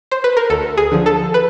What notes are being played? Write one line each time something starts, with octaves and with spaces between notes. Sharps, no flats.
C5
B4
A#4
D2 A4
G#4
D3 F3
A4
B4